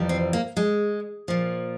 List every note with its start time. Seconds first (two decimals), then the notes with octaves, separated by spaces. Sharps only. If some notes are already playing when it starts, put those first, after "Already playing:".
Already playing: F2 C3 E3 G3
0.09 C4
0.33 A#3
0.57 G#3
1.28 A#2 F3